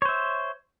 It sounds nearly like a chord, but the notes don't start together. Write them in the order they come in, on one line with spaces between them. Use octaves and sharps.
C#5 C5 E5